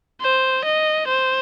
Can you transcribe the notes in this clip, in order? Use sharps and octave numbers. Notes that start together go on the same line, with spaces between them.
C5
D#5
C5